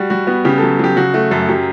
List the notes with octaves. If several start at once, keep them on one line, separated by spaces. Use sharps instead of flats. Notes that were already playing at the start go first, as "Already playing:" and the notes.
Already playing: G3 F#4
G3 F#4
B3 F#4
C#3 G4
F#3 A4
F#3 G4
C#3 F#4
A3 F#4
F#2 A4
F#3 G4